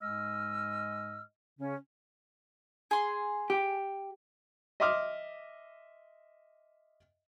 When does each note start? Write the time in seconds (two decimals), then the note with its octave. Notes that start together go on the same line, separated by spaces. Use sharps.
0.01 G#2 G#3 D#5 E6 F6
1.59 C#3 C#4
2.91 G#4 C6
3.50 G4
4.80 D#5 E5 C6 D6 D#6 F6